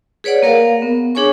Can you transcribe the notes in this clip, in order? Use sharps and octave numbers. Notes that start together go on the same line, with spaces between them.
G#4 B4 C#5 D5 F#5
A#3 A#4 F5
B3
D4 G#4 C#5 G#5 C#6